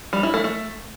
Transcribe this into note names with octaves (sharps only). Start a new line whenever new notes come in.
G3
E4
A3
A3